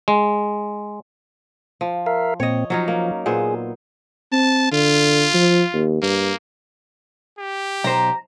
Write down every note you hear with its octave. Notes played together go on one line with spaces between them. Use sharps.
G#3
F3
A#4 E5 F5
A#2 C4 C#5 D#5
F3 F#3 C#4 D#4
A#3
A#2 B3 G#4 C5
C4 A5
D3 F4
F3
D#2
G2 A#3
G4
B1 C5 A#5